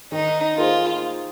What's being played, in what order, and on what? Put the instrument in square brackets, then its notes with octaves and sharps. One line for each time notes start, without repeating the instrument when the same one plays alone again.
[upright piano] D#3 [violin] D#4
[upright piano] A#3 D#4 G#4 C5 [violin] F4